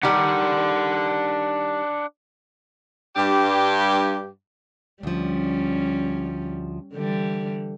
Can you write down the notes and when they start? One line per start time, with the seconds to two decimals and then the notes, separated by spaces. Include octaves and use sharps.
0.03 D#3 G3 D4 F#5
3.16 G2 G4
5.03 D2 F3 G3 C#4
6.94 D3 E3 G3